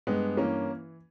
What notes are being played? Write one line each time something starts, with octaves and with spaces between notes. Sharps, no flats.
G2 G#3 B3
E3 A#3 C#4